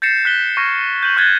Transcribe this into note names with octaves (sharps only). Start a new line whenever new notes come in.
G6 A6 A#6 C7 C#7 E7
F#6 B6 G7
C#6 F6 G#6 A#6
G6 D#7 F#7
C#6 F#6 G#6 A6 B6 G7